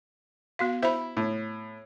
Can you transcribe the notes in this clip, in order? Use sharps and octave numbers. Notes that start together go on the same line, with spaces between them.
B3 F#4 F5
E4 C5 B5
A2